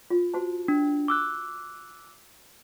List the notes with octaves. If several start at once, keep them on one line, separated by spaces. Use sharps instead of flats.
F4
F#4 C5 A5
D4
D6 E6 F#6